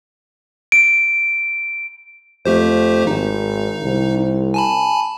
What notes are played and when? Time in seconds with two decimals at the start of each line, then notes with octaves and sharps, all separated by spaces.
0.72 D7
2.45 F2 A3 G4 C5
3.07 G#1 D#4
3.83 C2
4.54 G#5 A5 B5